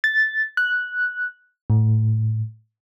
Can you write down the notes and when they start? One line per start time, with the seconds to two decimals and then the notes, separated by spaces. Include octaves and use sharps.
0.04 A6
0.57 F#6
1.70 A2